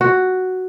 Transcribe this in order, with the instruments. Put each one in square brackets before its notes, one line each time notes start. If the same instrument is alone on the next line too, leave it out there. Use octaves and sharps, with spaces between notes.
[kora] F#4